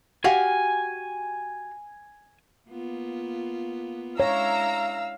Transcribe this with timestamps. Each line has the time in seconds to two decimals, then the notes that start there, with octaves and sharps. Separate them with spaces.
0.24 F#4 G4 F5 G#5
2.69 A#3 B3 F4
4.20 G#3 D4 E4 C#5 F5 A#5 E6